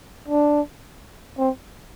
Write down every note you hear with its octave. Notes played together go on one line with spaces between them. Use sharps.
D4
C4